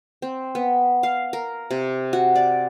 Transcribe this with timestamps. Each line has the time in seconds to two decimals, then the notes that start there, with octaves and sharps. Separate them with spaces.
0.22 C4
0.55 B3
1.03 F5
1.33 A#4
1.71 C3
2.13 F#4
2.35 D5